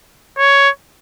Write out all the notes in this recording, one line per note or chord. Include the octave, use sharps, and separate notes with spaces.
C#5